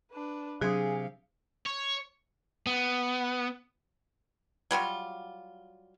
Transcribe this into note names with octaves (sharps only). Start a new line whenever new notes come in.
D4 B4
C3 F#3 D4 G#4 F5
C#5
B3
F#3 G3 F4 F#4